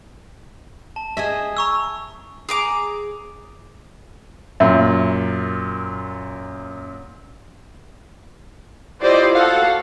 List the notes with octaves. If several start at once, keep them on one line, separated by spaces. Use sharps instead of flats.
A5
G#4 D#5 E5
A#5 C#6 E6
G#4 A#5 D6
F#2 A#2 E5
E4 F4 G4 C5 D5 D#5
F#4 A4 F5 F#5